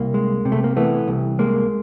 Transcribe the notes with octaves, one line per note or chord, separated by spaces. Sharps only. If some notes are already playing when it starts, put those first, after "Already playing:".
Already playing: C2 A#3
G#3
C3
A3
A#3
E3 A3 B3
C2
G#3 A#3